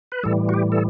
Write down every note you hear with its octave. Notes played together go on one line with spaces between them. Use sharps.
B4
A2 E3 G3 A4
F#4
G4
A4